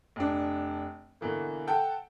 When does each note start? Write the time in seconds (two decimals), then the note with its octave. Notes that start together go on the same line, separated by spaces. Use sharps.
0.16 F1 D4
1.21 B2 D3 E3 A#3
1.67 A4 F#5 G5 A5